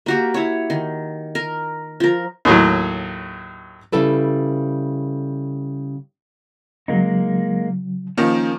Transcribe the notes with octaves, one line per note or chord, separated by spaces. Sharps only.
A#3 F#4 G4
E4 C#5
D#3
A#4
F3 A#4
D#2 A2 F#3
C#3 G3 E4 A4 B4
C#3 F#3 G#3 A#3 D#4
D#3 F3 A#3 C#4